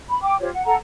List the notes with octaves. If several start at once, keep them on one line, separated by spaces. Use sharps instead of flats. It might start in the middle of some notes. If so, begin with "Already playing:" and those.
B5
G5 D6
F4 G4 C5 C#5
F#5
A4 F#5 A#5